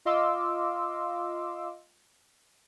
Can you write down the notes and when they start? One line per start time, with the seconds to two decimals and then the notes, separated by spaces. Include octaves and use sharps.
0.05 F4 D#5 F5 C6 D6 E6